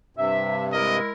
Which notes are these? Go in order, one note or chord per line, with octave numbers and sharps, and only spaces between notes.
G2 C3 E5
G#3 E4 A#4 D#5